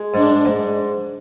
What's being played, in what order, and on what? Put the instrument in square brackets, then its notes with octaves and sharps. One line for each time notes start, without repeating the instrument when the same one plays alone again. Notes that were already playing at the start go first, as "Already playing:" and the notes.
Already playing: [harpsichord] G#3
[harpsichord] G#2 [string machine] D4
[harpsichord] G#2